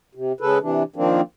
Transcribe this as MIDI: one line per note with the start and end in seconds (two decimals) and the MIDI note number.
0.15 0.32 48
0.40 0.58 49
0.40 0.58 56
0.40 0.58 69
0.40 0.58 71
0.62 0.83 48
0.62 0.83 52
0.62 0.83 62
0.96 1.21 51
0.96 1.21 53
0.96 1.21 58
0.96 1.21 60
0.96 1.21 62